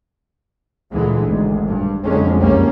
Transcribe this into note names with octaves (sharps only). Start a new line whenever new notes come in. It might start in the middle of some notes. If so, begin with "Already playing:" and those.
D2 A#2 D3 E3 G#3
G#1 D2
G2
F#1 F2 D3 G#3 C#4
F#1 C2 G3 A#3 C#4